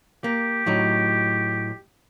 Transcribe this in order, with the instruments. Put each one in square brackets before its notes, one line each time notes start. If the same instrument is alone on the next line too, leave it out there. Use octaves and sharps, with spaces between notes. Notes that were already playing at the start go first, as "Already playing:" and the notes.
[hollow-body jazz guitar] A#3 [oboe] G4
[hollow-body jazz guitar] A2 F#3 D#4